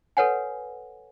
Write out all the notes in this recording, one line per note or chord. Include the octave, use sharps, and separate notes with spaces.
A4 B4 C#5 F#5 G#5